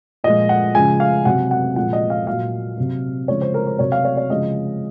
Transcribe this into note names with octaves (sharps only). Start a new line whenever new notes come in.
A#2 F3 G#3 D#5
F#5
C#3 F3 G#3 G#5
F5
C3 F#3 F#5
F#5
A#2 F3 G#3 F#5
D#5
F5
A#2 F#3 F5
C3 F#3
C#3 F3 G#3 C#5
C5
A#4
C5
C3 F#3 C#5
F5
C#5
C#5
C#3 F3 G#3 D#5